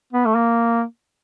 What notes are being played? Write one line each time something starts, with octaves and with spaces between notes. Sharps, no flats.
B3
A3
A#3